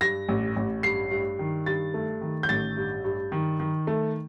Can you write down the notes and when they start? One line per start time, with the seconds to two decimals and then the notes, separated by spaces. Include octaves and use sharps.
0.01 G2 A#6
0.28 A1
0.56 A1
0.83 G2 C7
1.11 G2
1.39 D#3
1.66 G2 A6
1.94 A3
2.21 D#3
2.43 G6
2.49 A1 A6
2.77 G2
3.04 G2
3.32 D#3
3.60 D#3
3.87 A3